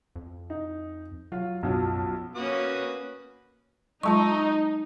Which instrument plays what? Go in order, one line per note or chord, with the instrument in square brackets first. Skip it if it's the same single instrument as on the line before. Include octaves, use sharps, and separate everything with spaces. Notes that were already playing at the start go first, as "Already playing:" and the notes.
[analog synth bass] F2
[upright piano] D#4
[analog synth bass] F#3 [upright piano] F4
[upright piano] B1 F3 F#3 [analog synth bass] F#2
[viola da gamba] A#3 C#4 [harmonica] F#4 B4 D#6
[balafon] F#3 G#3 F4 [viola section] D#4 [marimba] A5 C#6